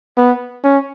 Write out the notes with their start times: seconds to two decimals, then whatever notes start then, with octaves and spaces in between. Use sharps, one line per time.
0.17 B3
0.64 C#4